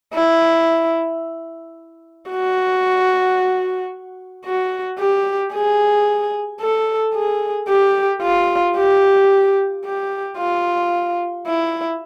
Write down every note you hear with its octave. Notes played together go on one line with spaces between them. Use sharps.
E4
F#4
F#4
G4
G#4
A4
G#4
G4
F4
G4
G4
F4
E4